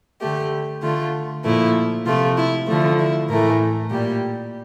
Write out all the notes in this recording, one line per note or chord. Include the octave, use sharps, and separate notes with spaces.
D3 A3 G4
D3 A3 F4
A#2 F3 A3 E4
C3 F3 A3 F4
E4
D3 F3 A3
E4
A2 E3 A3 A#4
A#2 G3 G4